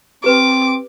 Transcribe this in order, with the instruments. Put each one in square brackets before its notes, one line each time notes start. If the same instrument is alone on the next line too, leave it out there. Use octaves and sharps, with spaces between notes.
[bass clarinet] C4 [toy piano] G4 B4 [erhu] D6